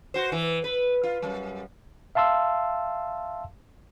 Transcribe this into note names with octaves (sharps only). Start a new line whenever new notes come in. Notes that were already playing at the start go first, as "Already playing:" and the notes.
F#4 C5
E3
B4
F4
F#2 G3
E5 F5 A5 C6 E6